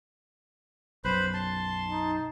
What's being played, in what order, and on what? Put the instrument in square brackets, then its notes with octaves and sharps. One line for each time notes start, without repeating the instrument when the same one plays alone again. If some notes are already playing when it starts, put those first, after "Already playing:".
[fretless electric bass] B1 F#2 [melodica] B4 C5 B5
[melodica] A5 C6
[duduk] D#4